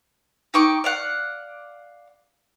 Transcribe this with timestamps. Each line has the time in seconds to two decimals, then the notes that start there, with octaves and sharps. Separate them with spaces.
0.54 D#4 G5 C#6 D6
0.84 D5 F5 F#5